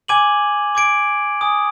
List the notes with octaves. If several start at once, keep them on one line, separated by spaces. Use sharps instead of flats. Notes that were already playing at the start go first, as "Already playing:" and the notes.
G#5 D6 G#6 D#7 F#7
D6 G#6 D7
G#5 D#6 G#6